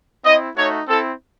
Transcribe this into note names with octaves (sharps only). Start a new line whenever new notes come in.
C4 E4 D#5
A3 D#4 F#4 C#5
C4 E4 A4